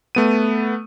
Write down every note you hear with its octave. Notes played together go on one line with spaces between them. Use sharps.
A3 B3 D#7